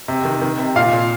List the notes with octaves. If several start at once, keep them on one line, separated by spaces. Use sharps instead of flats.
C3
D#3
D#3
C3
A#2 F5
A#2